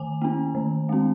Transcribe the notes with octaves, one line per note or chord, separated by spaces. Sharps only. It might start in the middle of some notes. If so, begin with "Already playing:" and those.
Already playing: D#3 G#5
A#3 C#4
D#3
G#3 C4